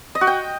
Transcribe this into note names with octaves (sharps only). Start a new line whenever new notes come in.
D#5
F#4
G5